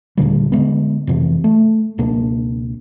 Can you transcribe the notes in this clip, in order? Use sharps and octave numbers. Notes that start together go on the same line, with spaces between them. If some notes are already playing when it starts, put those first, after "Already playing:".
D#2 A#2 D3 G3
D3 F#3 G#3 B3
F2 C3 E3
A3
C#2 B2 A#3 D4